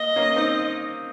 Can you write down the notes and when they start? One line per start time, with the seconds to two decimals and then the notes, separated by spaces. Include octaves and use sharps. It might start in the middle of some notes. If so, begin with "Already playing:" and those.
Already playing: A#3 D#5
0.16 A#3 C#4
0.36 C4 D#4